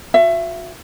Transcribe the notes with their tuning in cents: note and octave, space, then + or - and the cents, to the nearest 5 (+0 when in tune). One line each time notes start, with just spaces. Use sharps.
F#4 -35 E5 +25